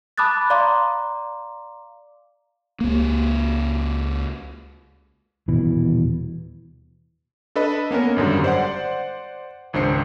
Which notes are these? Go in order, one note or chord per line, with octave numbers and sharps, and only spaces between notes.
A5 B5 D6 D#6 F#6 A6
D5 F5 A#5 C6 D6
C#2 A#3
D#1 B2 E3
D4 A4 B4 D#5 B5
A#3 B3 C#4 A#4
G#1 F#2 D3 G3
C5 D5 F#5
G#1 C#2 D4 C5 C7 C#7